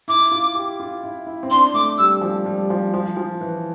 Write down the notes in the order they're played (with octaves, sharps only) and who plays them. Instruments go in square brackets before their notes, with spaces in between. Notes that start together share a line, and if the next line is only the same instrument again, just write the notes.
[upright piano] E4 [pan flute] D6
[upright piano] F4
G4
F4
E4
E4
C4
[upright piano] D4 [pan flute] C6
[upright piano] A3 [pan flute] D6
[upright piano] G3 [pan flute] E6
[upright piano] F3
G3
F3
F3
F3
E3